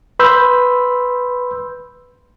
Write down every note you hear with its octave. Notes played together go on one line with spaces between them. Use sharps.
B4 B5 C6 E6 G6